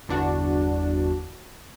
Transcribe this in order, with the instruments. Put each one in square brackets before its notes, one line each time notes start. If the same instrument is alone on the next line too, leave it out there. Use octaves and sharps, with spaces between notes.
[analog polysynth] G1 E2 D4 F#4